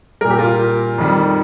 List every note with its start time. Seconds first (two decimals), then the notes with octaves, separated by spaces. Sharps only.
0.21 A#2 G3 A#4
0.30 G4
0.38 F4 A#4
0.98 F2 D#3 G3